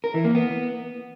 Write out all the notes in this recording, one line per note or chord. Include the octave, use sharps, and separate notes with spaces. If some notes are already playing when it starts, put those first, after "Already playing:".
A#4
E3
A#3
B3